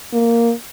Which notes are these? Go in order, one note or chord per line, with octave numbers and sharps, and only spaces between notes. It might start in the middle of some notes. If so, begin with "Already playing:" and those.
A#3